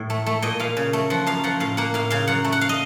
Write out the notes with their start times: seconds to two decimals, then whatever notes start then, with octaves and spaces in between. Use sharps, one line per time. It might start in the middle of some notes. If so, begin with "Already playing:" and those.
Already playing: A2
0.10 A3
0.26 A3
0.42 A#2 D#5
0.60 A#2 F5
0.77 C#3
0.93 A3
1.10 F3 F#5
1.26 F#2 F5
1.44 F3 F#5
1.60 A2 F5
1.77 A#3 F#5
1.94 A2 F5
2.10 C#3 F5
2.27 F#2 F#5
2.44 A3
2.52 F#5
2.61 F5
2.69 D#5